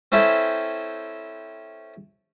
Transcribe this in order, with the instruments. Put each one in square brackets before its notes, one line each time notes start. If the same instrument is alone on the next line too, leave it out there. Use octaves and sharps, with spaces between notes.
[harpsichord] C4 C#4 E4 A4 E5 G5